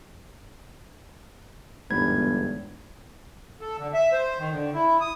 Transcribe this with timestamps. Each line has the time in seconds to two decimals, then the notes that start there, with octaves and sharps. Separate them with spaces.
1.91 G1 E2 G#2 B5 G#6
3.61 A4
3.78 D3
3.94 E5
4.12 C5
4.39 D#3
4.52 D3
4.74 E4
5.01 D#6